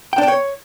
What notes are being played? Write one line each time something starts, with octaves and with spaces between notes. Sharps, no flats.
G5
D4
G5
C#5